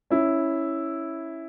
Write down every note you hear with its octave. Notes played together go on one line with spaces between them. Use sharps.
C#4 E4